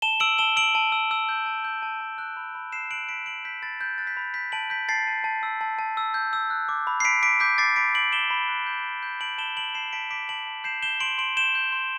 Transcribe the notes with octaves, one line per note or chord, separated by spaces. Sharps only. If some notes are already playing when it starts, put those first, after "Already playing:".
A5 E7 G7
E6 D7 F#7
A5 E7 G7
E6 D7 F#7
A5
E6
E6
G6
A5
G6
A5
A5
F#6
B5
B5
F#6 C7 E7
F#6 D7 F#7
B5 B6 D7
F#6 D7 F#7
F#6 G6 B6
B5 A6
F#6 G6
F#6 A6
G6 B6
B5
G6 B6
A5 D7 F#7
G6 B6
A5 A6 C7
A5
A5
E6
A5
A5
E6
G6
E6
F#6
D6
B5
C7
B5 B6 D7
D6 B6 D7
D6 G6 B6
D6 A6 C7
B5 B6 D7
D6 D7 F#7
D6 E7 G7
B5
F#6
G6
D6
G6
A5 D7 F#7
A5 E7 G7
A5 D7 F#7
A5 C7 E7
A5 B6 D7
D6 B6 D7
A5 D7 F#7
A5
G6 C7 E7
G6 E7 G7
C6 D7 F#7
C6 D7 F#7
G6 E7 G7
G6
C6